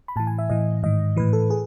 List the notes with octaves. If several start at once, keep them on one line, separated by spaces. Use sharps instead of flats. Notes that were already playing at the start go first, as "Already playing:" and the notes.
B5
A2 E3 A5
G#5
E5
A2 E3 D#5
G#2 D#3 D#5
A2 E3 B4
A4
G#4